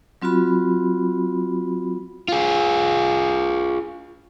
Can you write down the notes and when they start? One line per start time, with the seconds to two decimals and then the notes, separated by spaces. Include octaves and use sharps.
0.22 F#3 C4 F4 F#4 B5
2.28 F4 G#4